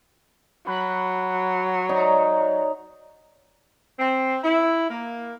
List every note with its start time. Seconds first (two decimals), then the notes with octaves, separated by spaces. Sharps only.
0.67 F#3 B5 F#6
1.89 D#4 C#5 D5 A#5
3.99 C4
4.44 E4
4.90 A#3